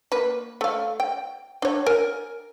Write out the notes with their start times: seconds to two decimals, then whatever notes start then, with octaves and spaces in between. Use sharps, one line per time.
0.12 A#3 B4
0.61 A3 F5
1.00 G5
1.62 D4 C#5
1.86 A#4 G#5